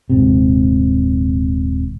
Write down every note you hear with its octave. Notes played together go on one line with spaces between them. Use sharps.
D#1 G#2 C3